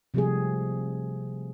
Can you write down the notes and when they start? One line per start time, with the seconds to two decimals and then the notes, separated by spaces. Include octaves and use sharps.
0.14 C3 F3 G3 A3 G4 G#4